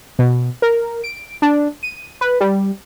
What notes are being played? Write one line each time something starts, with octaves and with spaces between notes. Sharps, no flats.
B2
A#4
D7
D4
D#7
B4
G3